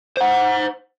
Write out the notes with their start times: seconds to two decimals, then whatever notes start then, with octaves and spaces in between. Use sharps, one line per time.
0.17 C5 F#5